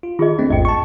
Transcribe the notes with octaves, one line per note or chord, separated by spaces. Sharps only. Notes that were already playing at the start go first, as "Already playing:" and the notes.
F4
D#3 F4 G#4 D#5
A3 C4 D4
A1 E2 G#2 D#5 G5
A5 C#6